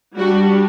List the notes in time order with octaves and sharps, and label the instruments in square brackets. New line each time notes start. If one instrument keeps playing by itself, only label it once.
[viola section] G3 D4 F#4